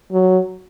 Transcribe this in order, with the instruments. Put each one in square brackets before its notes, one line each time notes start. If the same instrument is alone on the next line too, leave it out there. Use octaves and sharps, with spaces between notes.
[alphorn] F#3